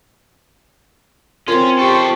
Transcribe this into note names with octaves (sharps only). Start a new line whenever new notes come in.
C4 C#4 F4 A#4
G4 A4 C5 G5 C#6